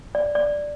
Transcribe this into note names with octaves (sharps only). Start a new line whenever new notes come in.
D5
D5